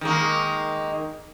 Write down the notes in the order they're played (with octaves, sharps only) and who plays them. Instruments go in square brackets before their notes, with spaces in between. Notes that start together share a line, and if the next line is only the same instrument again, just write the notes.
[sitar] D#3 G#3 A#3